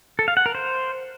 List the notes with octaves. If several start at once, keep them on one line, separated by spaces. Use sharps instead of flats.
A4
F5
F#5
A#4
C5